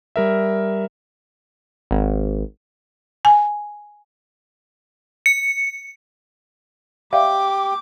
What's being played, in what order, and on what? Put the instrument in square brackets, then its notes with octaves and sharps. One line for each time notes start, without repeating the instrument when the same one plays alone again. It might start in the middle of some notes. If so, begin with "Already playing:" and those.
[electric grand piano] G3 A#4 E5
[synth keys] G#1
[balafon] G#5
[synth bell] C#7
[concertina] G4 [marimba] D5 E5 F5 [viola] D6